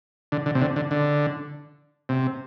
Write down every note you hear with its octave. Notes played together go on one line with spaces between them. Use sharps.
D3
D3
C3
D3
D3
D3
C3